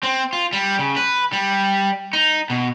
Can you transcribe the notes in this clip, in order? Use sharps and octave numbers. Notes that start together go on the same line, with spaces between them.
C4
F4
G3
C#3
B4
G3
D#4
B2